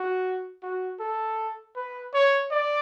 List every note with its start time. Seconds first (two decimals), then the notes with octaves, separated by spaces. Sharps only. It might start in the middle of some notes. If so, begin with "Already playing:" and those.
Already playing: F#4
0.63 F#4
1.00 A4
1.76 B4
2.14 C#5
2.51 D5